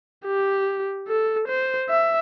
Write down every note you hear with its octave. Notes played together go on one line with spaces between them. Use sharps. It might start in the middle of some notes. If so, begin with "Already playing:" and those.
G4
A4
C5
E5